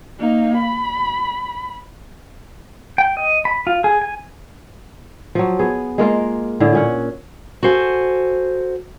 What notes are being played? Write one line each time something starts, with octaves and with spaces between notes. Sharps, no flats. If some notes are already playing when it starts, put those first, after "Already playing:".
A#3 D#4
B5
G5
D#5
B5
F4
G#4
G#5
F3 F#3
B3 G#4
G#3 A#3 F4 A#4
A2 D3 G#4
A#2 C#4 F#5
F#4 A4 C5 F#5 G#5